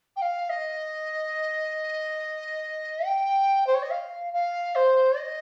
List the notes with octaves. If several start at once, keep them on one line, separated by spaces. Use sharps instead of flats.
G5
F5
D#5
G5
C5
C#5
D#5
F5
F5
C5
D#5